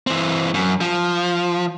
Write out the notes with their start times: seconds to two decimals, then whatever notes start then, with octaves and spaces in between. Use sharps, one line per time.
0.07 E3 C4
0.54 F#2
0.81 F3